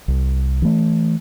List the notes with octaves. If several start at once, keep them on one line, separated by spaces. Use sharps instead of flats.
C2
E3 A3